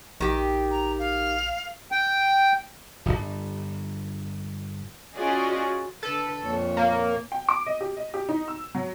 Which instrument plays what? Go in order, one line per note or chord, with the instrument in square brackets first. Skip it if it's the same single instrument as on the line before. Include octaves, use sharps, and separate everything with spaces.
[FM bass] A#1 [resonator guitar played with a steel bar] D#3 G4
[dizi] A#5
F5
[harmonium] G5
[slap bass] D1 G1
[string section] C#4 F4 F#4 G#4 D5 D#5
[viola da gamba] D3 B4 [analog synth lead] A4
[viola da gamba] F2 A#2 C#5
[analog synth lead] A#3
[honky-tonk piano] G5
D6
D#5
G4
D#5
G4
D#4
E6
F#3